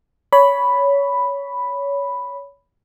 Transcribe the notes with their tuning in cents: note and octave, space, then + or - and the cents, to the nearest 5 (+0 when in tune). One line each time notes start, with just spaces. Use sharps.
C#5 +20 B5 +0